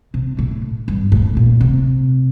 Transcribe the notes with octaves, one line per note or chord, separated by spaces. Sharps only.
C3
A2
G2
A2
A#2
C3